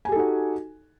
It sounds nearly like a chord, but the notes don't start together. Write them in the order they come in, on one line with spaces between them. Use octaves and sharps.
G#5 G4 A4 D#4 F#4